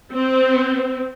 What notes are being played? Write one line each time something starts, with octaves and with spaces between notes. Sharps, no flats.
C4